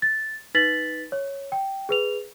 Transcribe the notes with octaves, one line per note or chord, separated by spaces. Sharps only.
A6
D#4 B4 A6 B6 F#7
C#5
G5
G#4 B4 F7